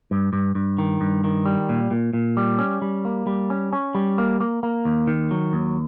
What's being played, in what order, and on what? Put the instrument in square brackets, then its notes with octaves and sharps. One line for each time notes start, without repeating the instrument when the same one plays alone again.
[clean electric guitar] G2
G2
G2
D#3
G2
D#3
G3
A#2
A#2
A#2
G3
C#4
G3
A#3
G3
C#4
C#4
G3
A#3
A#3
A#3
D#2
D#3
F#3
D#2